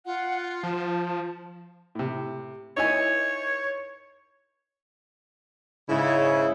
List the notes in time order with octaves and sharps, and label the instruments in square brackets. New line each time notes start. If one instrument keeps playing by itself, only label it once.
[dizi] F4 [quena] F#5
[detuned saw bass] F3 [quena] A5
[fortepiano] A2 C3
[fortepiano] D#4 E4 G#5 [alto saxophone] C#5
[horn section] G#2 C#3 [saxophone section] E4